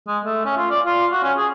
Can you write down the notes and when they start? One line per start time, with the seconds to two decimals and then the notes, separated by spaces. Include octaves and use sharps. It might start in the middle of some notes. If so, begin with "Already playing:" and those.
0.08 G#3
0.25 A3
0.46 C#4
0.57 F4
0.71 D5
0.86 F4
1.12 F#4
1.23 C#4
1.37 G#4